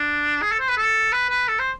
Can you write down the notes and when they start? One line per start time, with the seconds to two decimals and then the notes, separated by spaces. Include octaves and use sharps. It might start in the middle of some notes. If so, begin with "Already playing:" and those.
Already playing: D4
0.42 G#4
0.52 A4
0.60 C5
0.68 B4
0.77 A4
1.12 B4
1.30 B4
1.48 A4
1.59 C5